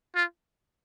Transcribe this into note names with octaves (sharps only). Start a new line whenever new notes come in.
F4